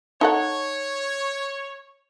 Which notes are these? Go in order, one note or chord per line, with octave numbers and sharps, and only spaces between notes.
D#4 A4 C#5 F#5